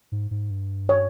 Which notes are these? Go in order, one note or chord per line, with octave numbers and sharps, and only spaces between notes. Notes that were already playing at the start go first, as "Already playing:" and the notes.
G#2
G#2
G2
C#5